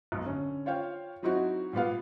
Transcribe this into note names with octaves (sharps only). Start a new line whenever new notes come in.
B1 F#2
D3 C#4
F4 C5 C#5 F5 G5
F#3 C4 D#4 E4 F#4
A#2 G3 B3 F5